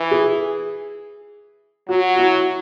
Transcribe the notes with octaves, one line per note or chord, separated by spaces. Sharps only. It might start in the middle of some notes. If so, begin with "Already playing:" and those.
Already playing: E3
G#4
F#3 F#4
F#4
E4